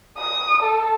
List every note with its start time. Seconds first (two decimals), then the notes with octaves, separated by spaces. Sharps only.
0.18 D#6
0.62 A4